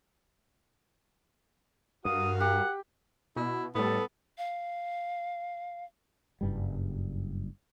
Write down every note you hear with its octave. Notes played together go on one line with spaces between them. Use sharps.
G2 F#4 A#4 F5 D#6
G4 F#5
B2 E4
A2 G3 B3 A4
F5
F#1 G2 G3